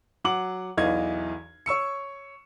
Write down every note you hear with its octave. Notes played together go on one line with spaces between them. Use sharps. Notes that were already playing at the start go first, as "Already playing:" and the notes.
F#3 F#5 D6 F#7
B1 E2 E3 D#5 F5 G#6
C#5 C#6 E6 C#7